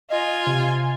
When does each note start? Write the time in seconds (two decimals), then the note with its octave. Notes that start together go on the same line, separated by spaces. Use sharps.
0.10 F4 D#5 G#5
0.47 C3